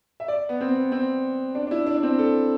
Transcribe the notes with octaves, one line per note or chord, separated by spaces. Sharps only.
E5
D5
B3
C4
B3
C4
D4
D4
E4
D4
D4
C4
A4